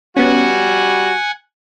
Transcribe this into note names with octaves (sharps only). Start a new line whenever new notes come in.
G3 B3 C#4 F#4 F#5 G#5